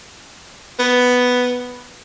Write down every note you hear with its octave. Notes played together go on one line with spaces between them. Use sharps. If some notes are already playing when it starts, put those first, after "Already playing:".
B3